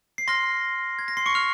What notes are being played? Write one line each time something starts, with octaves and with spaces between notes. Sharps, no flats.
C7
C6 F6 A#6
G#6
A#6
C6 C7
C#6 C#7
F6 F7